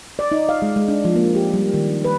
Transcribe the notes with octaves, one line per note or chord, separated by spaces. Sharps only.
D5
D#4
F5
G#3
G#3
D4
F3
A#3
G4
G3
D#3
B4